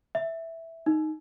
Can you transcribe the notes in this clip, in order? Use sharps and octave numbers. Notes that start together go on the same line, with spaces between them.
E5
D#4